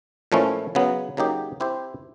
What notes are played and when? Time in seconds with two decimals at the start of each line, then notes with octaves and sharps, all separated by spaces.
0.32 A#2 F3 A3 C#4 E4
0.75 C#3 F#3 B3
1.17 C#3 F#3 A#3 D#4 G4
1.60 C4 E4 G4 C5